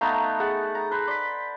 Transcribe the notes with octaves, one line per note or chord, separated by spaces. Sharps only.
A3 B3 D#4 F5 A#5 G6
G#4 F#5 A5
A#5
B4 C5
D5 C6 B6